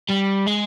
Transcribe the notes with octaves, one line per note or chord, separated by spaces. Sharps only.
G3
G#3